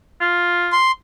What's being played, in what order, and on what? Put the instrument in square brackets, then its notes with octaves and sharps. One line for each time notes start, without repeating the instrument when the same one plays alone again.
[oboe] F4
[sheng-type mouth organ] C6